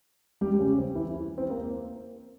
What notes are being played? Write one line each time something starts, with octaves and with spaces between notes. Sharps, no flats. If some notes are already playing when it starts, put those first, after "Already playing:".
G3 G4
C#3 C#4
C4
E3 E4
C4
A#3